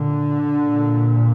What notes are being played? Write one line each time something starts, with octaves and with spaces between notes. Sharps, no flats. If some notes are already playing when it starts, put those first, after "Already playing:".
Already playing: A#2 D3
A#2